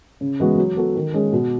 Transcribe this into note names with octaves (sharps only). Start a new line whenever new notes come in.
C#3
E3 G#3 B3 F#4
F#3
B3 F#4 A4
D#3
G#3 C#4 G#4
B2